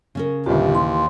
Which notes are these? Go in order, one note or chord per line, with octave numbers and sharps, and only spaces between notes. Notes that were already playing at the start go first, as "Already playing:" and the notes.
C#3 C#4 A#4
G1 D#2 A#2 G4
E3 C6